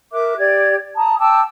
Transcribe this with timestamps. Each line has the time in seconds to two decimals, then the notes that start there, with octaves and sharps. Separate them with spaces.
0.12 A#4 E5 D6 F#6
0.38 G4 D5 G#6
0.96 A5 A#5 D#6
1.18 G5 A5 D6 E6